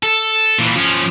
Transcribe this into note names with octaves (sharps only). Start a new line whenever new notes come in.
A4
A#2 E3
F3 C#4